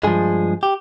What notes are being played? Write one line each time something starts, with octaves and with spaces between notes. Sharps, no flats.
G2 F3 G#3 G#4
G4